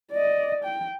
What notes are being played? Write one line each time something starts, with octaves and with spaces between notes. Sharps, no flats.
D5 D#5
G5